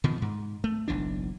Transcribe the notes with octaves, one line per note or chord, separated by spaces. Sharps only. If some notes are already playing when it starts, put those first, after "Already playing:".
B2 D#3 F3
G#2
A3
F#1 B1 E3 D4